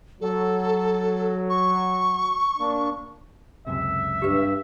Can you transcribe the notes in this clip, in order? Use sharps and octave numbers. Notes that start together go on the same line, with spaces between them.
F#3 A4
C#6
A#3 D4
C#2 F#2 C3 E5
G2 G4 B4